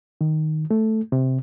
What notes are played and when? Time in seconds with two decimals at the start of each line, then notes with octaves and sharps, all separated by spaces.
0.21 D#3
0.71 A3
1.12 C3